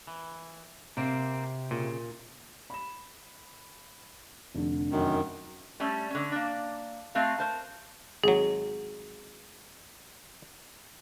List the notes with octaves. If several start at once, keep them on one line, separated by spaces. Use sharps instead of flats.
E3
C3 A#3 C4
A#2 C#3
B5 E7
F1 D3
F#2 D#3
G3 A3 C#4
D3 C#4
A#3 D4
A3 C4 F#4 F5
A#4 C5 A5
G#1 F#3 G#4